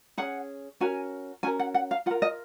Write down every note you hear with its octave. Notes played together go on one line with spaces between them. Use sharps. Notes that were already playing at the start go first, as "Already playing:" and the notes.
C#4 G#4 F#5
C#4 F#4 A#4 G#5
C#4 F#4 A#4 G#5
F#5
F#5
F5
F4 A#4 F#5
D#5